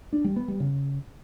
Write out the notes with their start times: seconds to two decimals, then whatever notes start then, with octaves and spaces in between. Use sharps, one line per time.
0.13 D4
0.24 G3
0.36 B3
0.48 G3
0.60 C#3